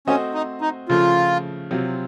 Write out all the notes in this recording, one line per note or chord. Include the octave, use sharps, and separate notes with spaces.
A3 C4 C#4 F#4 C5 D#5
D#4
D#4
C#3 F3 A3 F4
C3 F#3 C4 F4